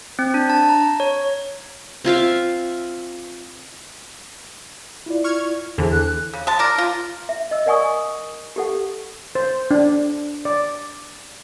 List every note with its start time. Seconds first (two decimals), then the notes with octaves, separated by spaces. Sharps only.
0.19 C4
0.34 D4
0.50 A5
0.69 A#5
1.00 C#5
2.04 C4 F4 E5 F5
5.06 E4 F4 D5
5.24 C#6 F6 G#6
5.78 E2 D3 E3 G#4 A4 C5
5.91 F#6
6.33 C#3
6.47 G#3 A5
6.59 D4 A#4
6.78 F4
7.29 E5
7.51 D#5 E6
7.66 A#4 D5 F#5 G#5 C#6 D#6
8.56 G4 A4 F#5
9.35 C5
9.71 D4
10.45 D5